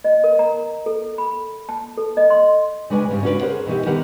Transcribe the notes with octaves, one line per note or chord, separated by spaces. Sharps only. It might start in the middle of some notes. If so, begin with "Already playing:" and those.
D#5
A#4
A#5
A4
B5
A5
A4
D#5
C6
C#3 G#3 D4 B4 G5 G#5
G#2 C#3 G3
C#4 D4 F#4 A4 B4 D5
G#4 A#4 C5 F#5
B2 E3 D#4 G4
D3 D#3 B3 G4 A#4 F#5